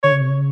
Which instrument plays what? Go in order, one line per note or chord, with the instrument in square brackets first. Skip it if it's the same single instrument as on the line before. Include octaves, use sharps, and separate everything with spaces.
[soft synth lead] D3 [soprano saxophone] C#5
[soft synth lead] C#3
C3
C#3